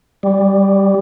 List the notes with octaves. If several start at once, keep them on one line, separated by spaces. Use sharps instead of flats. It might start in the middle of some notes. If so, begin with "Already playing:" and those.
G3